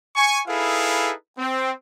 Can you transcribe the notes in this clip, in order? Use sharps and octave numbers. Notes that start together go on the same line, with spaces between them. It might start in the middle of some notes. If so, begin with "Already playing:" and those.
G#5 C#6
D#4 E4 G#4 A4 B4 F5
C4